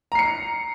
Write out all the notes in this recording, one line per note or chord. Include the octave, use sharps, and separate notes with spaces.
A#5 C7 C#7